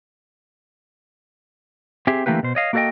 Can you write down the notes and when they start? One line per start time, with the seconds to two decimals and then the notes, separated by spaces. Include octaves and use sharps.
2.07 C4 G4 G#4 E5
2.26 D3 E3 A3 A#3 G4 B4
2.43 B2 C5
2.55 C#5 D#5 F5
2.73 A#3 F#4 A4 C5 D#5 G5